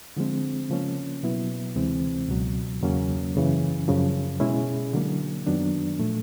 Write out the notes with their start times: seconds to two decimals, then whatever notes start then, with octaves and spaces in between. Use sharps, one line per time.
0.17 D3 F3 G#3 C4
0.70 C#3 F3 A#3 C#4
1.23 B2 F#3 B3 E4
1.76 D2 C3 E3 G#3 C4
2.28 C#2 B2 F#3
2.81 E2 C#3 F#3 A#3 C#4
3.35 F#2 C#3 E3
3.88 F#2 C#3 F3
4.40 B2 G#3 C#4 E4 G#4
4.93 D3 F#3 A#3
5.47 F#2 D#3 F#3 B3 D4
5.99 A#2 F3 A3